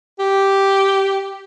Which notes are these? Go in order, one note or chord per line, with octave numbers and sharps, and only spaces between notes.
G4